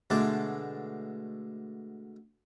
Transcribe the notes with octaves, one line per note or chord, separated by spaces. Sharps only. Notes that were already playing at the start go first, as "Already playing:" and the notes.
B2 D3 G#3 A3 A5 D6